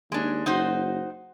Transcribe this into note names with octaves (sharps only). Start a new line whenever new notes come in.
D#2 G#3 D4
F#1 D#4 F#4 C5